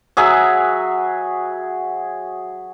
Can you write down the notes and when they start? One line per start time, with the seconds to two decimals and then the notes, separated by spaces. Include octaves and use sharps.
0.17 F#3 G#4 E5